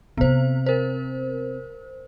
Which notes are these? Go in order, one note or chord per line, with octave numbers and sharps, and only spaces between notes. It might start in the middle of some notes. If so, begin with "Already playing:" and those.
C3 B3 C4 C5
A#4 C5